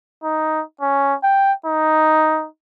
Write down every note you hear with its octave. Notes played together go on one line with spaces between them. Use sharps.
D#4
C#4
G5
D#4